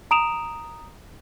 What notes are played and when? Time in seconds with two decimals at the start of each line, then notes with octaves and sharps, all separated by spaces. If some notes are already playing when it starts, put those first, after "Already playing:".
0.11 A#5 D#6 D7 E7 F7